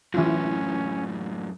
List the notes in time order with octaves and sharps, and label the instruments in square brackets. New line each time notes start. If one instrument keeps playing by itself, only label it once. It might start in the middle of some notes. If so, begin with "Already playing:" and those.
[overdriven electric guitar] F#2 A2 [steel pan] E3 E4 F4 [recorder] C#4